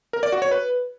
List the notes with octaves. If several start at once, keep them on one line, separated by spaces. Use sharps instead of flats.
A#4
D5
F#4
C#5
B4